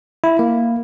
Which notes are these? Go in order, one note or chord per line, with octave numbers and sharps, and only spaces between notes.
E4
A#3